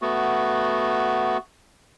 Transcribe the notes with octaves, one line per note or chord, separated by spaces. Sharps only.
A3 B3 F#4